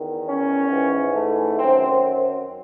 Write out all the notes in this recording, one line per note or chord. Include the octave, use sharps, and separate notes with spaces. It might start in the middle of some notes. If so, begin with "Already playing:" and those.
Already playing: E2 D#3
C#4
G#2 E3
A3
F#2 D#3 C4